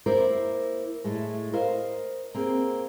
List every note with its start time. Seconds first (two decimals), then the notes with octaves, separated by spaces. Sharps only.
0.06 A#3 E4 A#4 C5 D5
1.04 A2 G#3 A3
1.53 A#4 C5 D#5 F5
2.34 A#3 C4 G#4